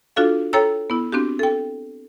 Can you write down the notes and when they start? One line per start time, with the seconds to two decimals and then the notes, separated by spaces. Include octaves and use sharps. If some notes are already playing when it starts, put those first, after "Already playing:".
0.16 D4 F4 F#4 A4 F5
0.53 A4 C#5 G5 A#5 E6
0.90 B3 E4
1.12 C4 D4 F#4 G4
1.39 A4 G5